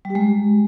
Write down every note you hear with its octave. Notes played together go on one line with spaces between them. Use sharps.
G3
G4
G#3